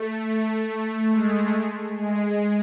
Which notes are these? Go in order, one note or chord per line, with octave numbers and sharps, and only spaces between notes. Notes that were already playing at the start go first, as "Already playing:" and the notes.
Already playing: A3
A3
A3
G#3
G#3